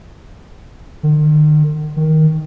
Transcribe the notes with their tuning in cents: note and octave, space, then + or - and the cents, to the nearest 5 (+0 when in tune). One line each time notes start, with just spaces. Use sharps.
D#3 -45
D#3 +10